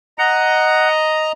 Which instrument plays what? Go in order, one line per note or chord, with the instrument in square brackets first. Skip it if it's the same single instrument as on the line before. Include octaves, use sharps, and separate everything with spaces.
[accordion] D#5 A#5 [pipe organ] F#5